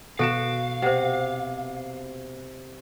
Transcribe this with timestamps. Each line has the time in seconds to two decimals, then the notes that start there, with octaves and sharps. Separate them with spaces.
0.19 B2 F#4 A4 F5 D7 E7
0.82 C3 C5 F#5